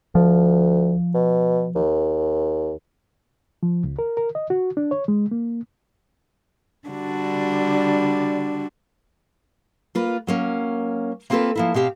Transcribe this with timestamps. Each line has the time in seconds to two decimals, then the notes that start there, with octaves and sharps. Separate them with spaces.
0.15 D2 F3
1.14 B2
1.75 D#2
3.63 F3
3.84 C#2
3.99 A#4
4.17 A#4
4.35 D#5
4.50 F#4
4.77 D4
4.91 C#5
5.08 G#3
5.31 A#3
6.88 D3 G3 D4 F#4
9.95 A#3 F4 B4
10.27 F#3 A#3 C#4
11.30 A#3 C4 F4 G#4 A4 B4
11.56 F3 A#3 E4
11.74 B2 C4 G4 F5